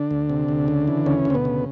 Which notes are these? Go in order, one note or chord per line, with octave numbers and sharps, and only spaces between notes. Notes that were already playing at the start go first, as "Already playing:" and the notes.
Already playing: D3 D4
D2
C3
D2
C#3
E3
D2 C#3 C#4
D2 C4
B2 B3
C#3